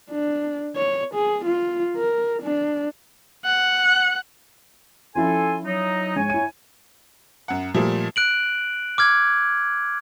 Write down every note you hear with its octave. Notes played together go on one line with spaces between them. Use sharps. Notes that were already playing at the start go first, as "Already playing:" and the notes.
D4
C#5
G#4
F4
A#4
D4
F#5
F3 C#4 E4 A4 G#5 C6
F#3 D#4
G#2 C#5 G#5
E4 D#7
F#2 F#5
A#2 F3 G3 A3
F#6 D7 F#7
D6 F6 G#6